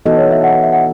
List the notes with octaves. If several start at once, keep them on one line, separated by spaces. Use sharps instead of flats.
E3 B3 D#4 F#4 A4 D#5
C#5
E5
F#5
E5
F#5